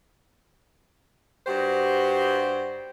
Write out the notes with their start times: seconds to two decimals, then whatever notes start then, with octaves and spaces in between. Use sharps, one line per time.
1.47 G2 F#4 G4 C5